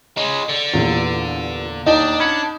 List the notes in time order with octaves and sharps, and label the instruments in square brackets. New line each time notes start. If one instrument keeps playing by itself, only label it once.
[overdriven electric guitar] G#3 C#4
D3
[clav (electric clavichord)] G1 [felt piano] E2 A#2
[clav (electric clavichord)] D#2 [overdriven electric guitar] D4 [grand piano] D#4
[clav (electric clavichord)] C#4 F#5 [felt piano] B5